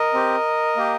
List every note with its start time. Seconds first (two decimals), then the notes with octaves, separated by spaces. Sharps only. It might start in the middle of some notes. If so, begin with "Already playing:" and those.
Already playing: A#4 D#5
0.14 C4 G4
0.77 A#3 G4